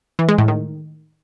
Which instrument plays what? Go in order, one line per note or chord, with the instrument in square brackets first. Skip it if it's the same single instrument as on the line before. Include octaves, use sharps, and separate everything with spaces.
[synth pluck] E3
G#3
A2
D#3